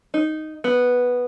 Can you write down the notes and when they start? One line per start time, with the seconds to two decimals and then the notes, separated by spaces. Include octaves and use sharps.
0.14 D#4
0.64 B3